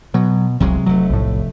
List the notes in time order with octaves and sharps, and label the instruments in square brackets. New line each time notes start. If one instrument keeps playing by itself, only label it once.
[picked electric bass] B2 [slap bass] F#3
[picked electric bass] F1 C2 F2 [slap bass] C3 F#3 G#3
[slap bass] F1 A3 [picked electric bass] F#3
[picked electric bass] B1 A2